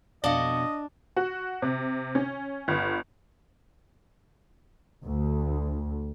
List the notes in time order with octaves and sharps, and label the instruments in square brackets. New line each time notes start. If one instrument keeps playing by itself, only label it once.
[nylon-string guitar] F2 B2 [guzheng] D4 [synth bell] D5 F5 [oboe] D#5
[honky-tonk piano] F#4
C3
C#4
G1
[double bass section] D2